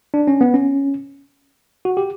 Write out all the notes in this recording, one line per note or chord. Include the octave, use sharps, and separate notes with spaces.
D4
C#4
B3
C#4
F#4
G4